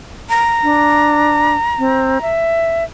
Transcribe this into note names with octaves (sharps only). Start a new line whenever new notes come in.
A#5
D4
C4
E5